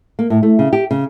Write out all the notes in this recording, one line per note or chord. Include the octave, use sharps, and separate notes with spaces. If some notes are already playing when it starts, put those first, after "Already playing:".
A#3
A2
A3
C#3
G4
C#3